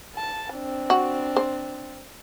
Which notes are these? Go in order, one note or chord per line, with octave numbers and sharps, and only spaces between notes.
A5
C4 D4
F#4
C5